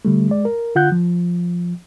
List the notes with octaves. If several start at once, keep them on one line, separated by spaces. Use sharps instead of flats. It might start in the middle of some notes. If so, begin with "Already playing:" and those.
D3 G3 A3
G#3 D5
A#4
D3 F4 F#5 F#6 G6
F3